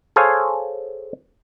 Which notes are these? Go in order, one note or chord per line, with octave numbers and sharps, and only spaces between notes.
G#4 A4 C5 C#5 F5 G#5